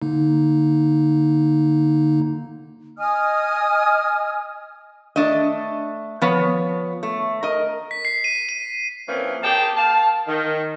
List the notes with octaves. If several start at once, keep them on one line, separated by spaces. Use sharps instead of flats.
D3 A#3 D#4
D#5 G#5 D#6 F6
A3 D4 D#5
F3 B3 C#5
A3
A#4 D#5
B6
C7
D#7
D#7
E3 F3 A#3 C4 C#4
A#3 G4 G#4 G5 A5
F5 A5
D#3